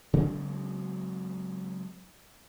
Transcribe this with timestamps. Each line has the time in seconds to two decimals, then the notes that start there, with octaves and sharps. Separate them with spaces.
0.13 C#3 F#3 G#3 C4